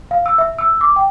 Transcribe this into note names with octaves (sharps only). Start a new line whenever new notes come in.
F5
E6
E5
E6
D6
G5